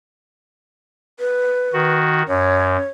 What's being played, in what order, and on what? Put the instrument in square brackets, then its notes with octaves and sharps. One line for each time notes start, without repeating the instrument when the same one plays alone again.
[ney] B4
[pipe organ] D#3 F#4
[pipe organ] F#2 [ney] C#5